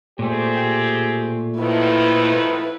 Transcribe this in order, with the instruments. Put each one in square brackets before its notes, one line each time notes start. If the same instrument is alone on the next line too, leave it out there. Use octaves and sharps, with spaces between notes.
[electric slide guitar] A#2 A3 [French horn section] C4 G4 G#4
[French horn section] A2 D#3 F3 [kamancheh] E4 B4